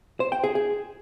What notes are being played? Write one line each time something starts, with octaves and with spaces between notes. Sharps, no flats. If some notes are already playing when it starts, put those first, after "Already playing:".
C5
G5
G#4
G#4